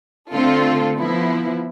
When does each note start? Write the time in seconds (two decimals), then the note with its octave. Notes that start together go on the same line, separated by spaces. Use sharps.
0.31 D3 A3 C4 F4 A4
0.97 F3 B3 E4